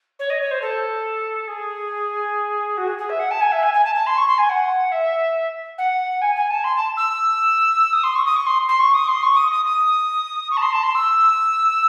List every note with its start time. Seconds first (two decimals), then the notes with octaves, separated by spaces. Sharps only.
0.19 C#5
0.30 D#5
0.40 C#5
0.51 C5
0.62 A4
1.48 G#4
2.77 F#4
2.88 G#4
2.98 G#4
3.09 E5
3.19 F#5
3.31 A5
3.41 G#5
3.52 E5
3.63 G#5
3.74 G#5
3.84 A5
3.95 A5
4.07 C6
4.17 C#6
4.27 C6
4.38 G#5
4.49 F#5
4.92 E5
5.78 F#5
6.21 G#5
6.36 G#5
6.50 A5
6.64 C6
6.75 A5
6.97 E6
7.93 D#6
8.03 C6
8.15 C#6
8.25 D#6
8.36 C#6
8.46 C6
8.69 C6
8.80 C#6
8.94 D#6
9.08 C6
9.23 C#6
9.36 D#6
9.51 D#6
9.65 D#6
10.51 C#6
10.57 A5
10.62 C6
10.73 A5
10.83 C6
10.95 E6